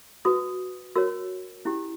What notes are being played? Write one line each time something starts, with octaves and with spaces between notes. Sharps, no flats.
F#4 B4 D#6
F#4 A#4 C#5 E6
C#4 E4 G4